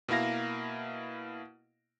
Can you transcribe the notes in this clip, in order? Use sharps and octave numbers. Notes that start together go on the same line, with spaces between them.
B2 A#3 E4 F5 A#6